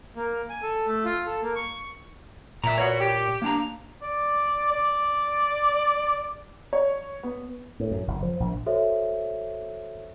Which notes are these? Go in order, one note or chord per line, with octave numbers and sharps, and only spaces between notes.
A#3
G#5
A4
A3
F4
A4
A#3
C#6
A#2 E5 A#5
B2 F#4 C#5
G4
A#3 D4 A#5
D5
D5
C#5
B3
A2
F#2
F#1
F3
A#1
F#4 A4 C5 C#5 E5